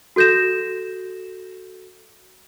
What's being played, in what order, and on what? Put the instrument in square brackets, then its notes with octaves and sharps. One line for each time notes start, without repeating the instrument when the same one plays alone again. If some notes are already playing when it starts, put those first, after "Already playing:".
[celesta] F#4 A4 G6 A#6 E7